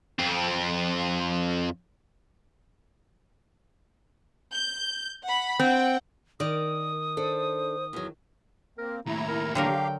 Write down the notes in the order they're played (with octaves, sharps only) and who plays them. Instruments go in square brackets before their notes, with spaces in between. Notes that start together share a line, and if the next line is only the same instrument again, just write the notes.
[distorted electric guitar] F2 C4
[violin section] G6
F#5 B5
[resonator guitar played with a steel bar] C4 [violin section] F#5 G5
[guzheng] D#3 [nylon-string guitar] A#4 D5 [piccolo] D#6
[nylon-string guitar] D4 A4 [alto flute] C5
[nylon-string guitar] E2 F#3
[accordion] A#3 C4 [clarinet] A#4
[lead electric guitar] D#2 A2 [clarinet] A3 [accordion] E4 A#5
[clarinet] A#4
[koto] D3 F#3 A#4 [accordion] G4 F5 [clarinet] G5